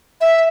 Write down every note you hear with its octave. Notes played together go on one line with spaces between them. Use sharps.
E5